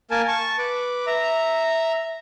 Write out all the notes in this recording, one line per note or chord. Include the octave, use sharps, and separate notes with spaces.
A#3 A#4 G#5 A5
A5 C#6
B4 D6
E5 A#5